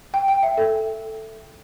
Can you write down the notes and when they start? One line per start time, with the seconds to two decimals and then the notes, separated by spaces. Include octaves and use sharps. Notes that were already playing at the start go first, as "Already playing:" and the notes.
0.14 G5
0.28 G5
0.43 E5
0.57 A4